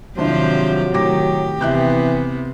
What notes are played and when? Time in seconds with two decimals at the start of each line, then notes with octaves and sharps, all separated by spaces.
0.18 G#1 C3 F3 F#3 D4 E4 G4 C5
0.94 A2 D#3 G4 D6 A#6
1.61 C3 E3 B3 E5 F#6 G6